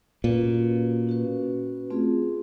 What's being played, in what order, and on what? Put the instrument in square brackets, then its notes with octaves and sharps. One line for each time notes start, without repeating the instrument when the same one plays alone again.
[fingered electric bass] A#2 [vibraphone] C#4 F#4 B4
[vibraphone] C#4 F#4 B4
A3 C4 F4 G#4